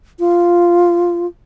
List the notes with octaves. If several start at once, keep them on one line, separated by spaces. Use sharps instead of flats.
F4